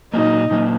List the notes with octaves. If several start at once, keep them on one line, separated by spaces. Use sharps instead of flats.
A#2 F#3 A#3 D#4
A#2 F#3 A#3